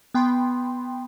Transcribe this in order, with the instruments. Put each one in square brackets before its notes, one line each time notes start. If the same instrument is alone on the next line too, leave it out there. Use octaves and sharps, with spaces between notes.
[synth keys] B3 G5 B5 C6